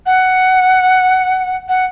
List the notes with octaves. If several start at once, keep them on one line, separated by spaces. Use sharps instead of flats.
F#5
F#5